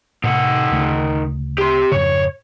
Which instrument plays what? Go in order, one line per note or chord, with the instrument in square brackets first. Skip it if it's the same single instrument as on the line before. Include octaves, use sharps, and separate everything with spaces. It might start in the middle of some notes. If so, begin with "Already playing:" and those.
[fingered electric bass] A2 C3 [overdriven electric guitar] D#3 F#5
[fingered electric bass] D2 C#3 A3
[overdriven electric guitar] G4 C6
[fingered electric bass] F2 G#2 C#3 [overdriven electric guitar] C#5